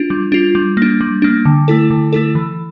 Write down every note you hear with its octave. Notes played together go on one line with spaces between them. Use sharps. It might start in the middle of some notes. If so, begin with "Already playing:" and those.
Already playing: D4 F4
G3
D4 F4
G3
A#3 D4
G3
A#3 D4
D3
A3 E4 A4
D3
A3 E4 A4
E3